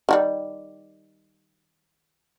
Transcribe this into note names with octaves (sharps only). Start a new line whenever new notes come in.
D#3 F#3 G3